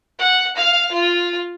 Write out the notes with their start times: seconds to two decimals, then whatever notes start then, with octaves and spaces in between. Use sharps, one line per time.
0.19 F#5
0.56 F5
0.92 F4